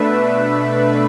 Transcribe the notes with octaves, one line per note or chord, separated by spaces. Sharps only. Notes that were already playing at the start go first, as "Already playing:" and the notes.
Already playing: B2 A3 D4 B4 E5